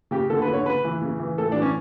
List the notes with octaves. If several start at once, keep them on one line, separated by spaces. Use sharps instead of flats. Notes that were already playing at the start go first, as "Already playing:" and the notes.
C#3 G4
D3 A4
B4
D3
C#5
C#3 B4
E3
C#3
E3
A2 A4
E3 D4
C#4